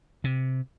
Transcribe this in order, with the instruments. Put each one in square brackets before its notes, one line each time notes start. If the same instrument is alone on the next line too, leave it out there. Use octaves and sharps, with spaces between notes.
[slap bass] C3